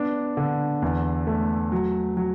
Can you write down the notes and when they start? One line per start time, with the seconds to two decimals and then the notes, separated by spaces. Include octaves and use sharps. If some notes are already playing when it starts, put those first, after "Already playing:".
Already playing: B3 D4
0.37 D3
0.82 E2
1.27 A3
1.72 F#3
2.17 F#3